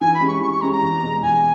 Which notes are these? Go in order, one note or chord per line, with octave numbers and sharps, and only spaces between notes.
E3 G#5
B5
G#3 C#4 G4
C#6
E3 C#6
C#6
G#3 C#4 G4 A#5
A#5
E2
B2 G#3
E2 G#5